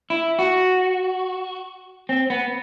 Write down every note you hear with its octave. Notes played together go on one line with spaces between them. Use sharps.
E4
F#4
C4
B3